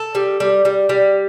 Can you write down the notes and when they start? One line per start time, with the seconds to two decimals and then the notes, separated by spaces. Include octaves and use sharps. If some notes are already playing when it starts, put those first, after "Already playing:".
Already playing: A4
0.15 G3
0.40 G3
0.65 G3
0.89 G3